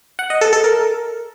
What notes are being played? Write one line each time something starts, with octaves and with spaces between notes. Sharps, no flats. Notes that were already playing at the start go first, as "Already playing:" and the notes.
F#5
D#5
A4
A4
A#4